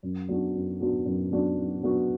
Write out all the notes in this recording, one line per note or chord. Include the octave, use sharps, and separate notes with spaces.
F#2
F#3 B3 D4 F#4
F#2
F#3 B3 D4 F#4
F#2
F#3 B3 D4 F#4
F#2
F#3 B3 D4 F#4